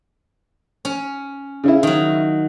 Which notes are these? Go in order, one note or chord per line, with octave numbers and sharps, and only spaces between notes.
C#4
C#3 C#4 E4
D#3 F#3